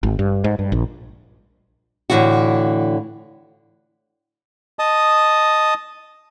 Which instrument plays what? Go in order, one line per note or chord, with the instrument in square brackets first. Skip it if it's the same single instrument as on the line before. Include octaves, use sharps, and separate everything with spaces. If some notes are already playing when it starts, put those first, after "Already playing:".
[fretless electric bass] G#1
G2
G#2
G2
A#1
[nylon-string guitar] A2 D3 E3 F4 F#4
[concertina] D#5 A5 D#6